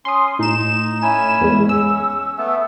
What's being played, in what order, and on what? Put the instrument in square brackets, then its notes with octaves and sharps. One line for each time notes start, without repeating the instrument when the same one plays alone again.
[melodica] C#4 [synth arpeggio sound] C6 D#6
[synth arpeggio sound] A2 E7 [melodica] D#4
[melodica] C#4 E4 G#5
[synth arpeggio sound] E2 G#3
[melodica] C#4 [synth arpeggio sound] E6
[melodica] A3 B3